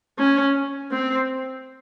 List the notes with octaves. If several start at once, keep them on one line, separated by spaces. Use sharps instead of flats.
C#4
C4